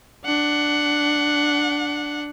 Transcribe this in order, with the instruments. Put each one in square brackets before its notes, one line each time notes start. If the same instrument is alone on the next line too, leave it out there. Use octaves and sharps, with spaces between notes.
[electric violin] D4 F#5